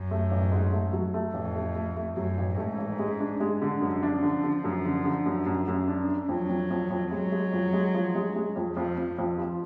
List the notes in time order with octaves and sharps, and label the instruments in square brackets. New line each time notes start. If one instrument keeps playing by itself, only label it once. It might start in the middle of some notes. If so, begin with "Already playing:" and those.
Already playing: [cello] F#2
[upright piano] A3
A1
G#2
A3
F#3
A3
[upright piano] A1 [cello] F2
[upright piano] A3
A3
A3
[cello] F#2 [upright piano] F#3
[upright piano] A1
[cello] G#2 [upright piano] A3
[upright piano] A1
G#3
D4
G#3
D3
[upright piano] F#2 [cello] F3
[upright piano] D4
D3
D3
F#2
D3
D3
F#2
F#2
F#2
D4
D4
[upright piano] F2 [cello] F#3
[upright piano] F2
F2
F2
[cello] F#3 [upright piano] G#3
[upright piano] G#3
F2
G#3
F3
G#3
G#3
F2
[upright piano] F2 [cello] F3
[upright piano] F2
F2
F3